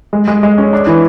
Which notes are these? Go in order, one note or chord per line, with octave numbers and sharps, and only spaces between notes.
G#3
G#3
G#3
C#4
D4
E3